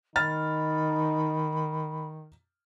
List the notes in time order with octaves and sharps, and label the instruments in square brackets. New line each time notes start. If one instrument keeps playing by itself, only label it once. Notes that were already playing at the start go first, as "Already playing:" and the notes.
[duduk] D#3 [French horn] D#4 [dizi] B5 [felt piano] F6 A6